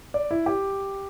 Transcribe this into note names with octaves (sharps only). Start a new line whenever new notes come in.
D5
E4
G4